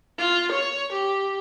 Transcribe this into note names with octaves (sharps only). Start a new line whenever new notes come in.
F4
C#5
G4